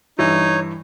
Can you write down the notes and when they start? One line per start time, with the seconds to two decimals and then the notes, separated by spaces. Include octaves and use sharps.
0.19 G2 E3 D#4 E4 C#5